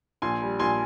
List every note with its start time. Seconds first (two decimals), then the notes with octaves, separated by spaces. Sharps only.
0.22 A#1 G#5 C6
0.42 G3
0.59 A#1 G#5 C6